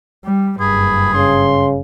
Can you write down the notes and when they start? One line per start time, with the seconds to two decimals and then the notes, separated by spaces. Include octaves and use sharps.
0.25 G3
0.60 F#1 G2 G#4 B5
1.14 C#3 C6